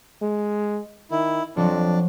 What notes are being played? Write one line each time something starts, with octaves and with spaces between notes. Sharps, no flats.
G#3
D#3 E4
F2 F3 F#3 D4